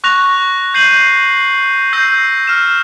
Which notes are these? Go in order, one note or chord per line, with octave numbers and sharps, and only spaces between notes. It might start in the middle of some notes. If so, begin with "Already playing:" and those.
C#6 F#6 A#6 F7
F#6 G6 C7 D#7 F#7
E6 G6 A#6 C7
F6 E7